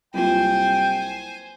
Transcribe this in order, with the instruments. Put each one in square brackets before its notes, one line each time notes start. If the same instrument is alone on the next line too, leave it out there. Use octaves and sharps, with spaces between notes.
[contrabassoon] C2 [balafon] F#3 A#3 F4 [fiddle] C5 G#5 [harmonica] G5